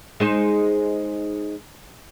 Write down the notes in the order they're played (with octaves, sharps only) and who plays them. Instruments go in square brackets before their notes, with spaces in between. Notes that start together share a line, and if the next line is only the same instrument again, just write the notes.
[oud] G#3 D#4 C5